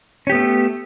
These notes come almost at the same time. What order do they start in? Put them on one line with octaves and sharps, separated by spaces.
C#4 G4 B3 A3